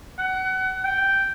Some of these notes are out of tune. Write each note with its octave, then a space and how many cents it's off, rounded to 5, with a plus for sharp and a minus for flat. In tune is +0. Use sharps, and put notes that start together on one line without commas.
F#5 +30
G5 -5